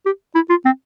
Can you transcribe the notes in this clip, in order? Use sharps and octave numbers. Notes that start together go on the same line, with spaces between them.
G4
E4
F4
C4